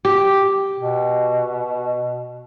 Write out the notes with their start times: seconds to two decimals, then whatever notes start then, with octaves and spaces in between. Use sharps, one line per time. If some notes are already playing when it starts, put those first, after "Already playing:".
0.05 G4
0.78 B2